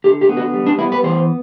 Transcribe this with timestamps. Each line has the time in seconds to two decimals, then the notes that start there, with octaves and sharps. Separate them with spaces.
0.04 D3 G4
0.21 G4
0.29 B3
0.37 F#4
0.54 G3
0.66 D4
0.79 B3 E4
0.92 B4
1.04 E3 C5